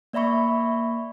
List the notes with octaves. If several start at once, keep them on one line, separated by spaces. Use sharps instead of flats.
A#3 D5 E5 B5 C#6